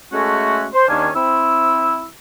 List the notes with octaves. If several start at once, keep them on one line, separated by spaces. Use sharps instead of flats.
G#3 A3 C#4 F#4
C5
D#2 D#3 C#4 D4 F5 G#5
C4 E4 E6